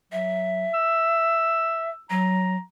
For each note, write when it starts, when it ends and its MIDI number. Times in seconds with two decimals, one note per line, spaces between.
0.12 0.66 54
0.12 1.90 76
0.74 2.03 88
2.10 2.55 54
2.10 2.61 82